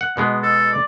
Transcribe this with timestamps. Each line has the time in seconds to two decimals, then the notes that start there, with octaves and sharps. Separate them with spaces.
0.01 F#5
0.17 B2 G#3 B3
0.43 A4
0.73 D5